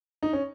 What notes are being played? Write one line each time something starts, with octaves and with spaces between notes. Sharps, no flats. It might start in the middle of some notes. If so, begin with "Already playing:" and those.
D#4
C#4